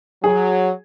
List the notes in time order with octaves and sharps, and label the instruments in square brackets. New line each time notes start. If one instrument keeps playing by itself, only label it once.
[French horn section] F#3 [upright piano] G#4